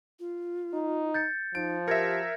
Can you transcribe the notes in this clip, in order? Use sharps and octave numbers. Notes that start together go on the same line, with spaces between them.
F4
D#4
G6 A6 C#7
F3 D#4 D7
G4 A#4 E5 G#6 A#6 C#7